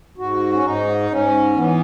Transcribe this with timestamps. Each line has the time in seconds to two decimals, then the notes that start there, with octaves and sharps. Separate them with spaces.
0.18 G#2 F#4
0.53 C#4
0.64 G#2 D#4
1.10 G#2 C#4
1.56 E3 B3